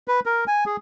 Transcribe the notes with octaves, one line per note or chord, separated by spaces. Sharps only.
B4
A#4
G#5
G#4